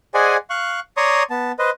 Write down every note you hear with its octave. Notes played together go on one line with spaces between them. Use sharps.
G#4 C5 D5 D#5 F#5 G#5
F5 C#6 F#6
C#5 D5 A#5 C6 C#6 D#6
B3 A5
B4 C5 D#5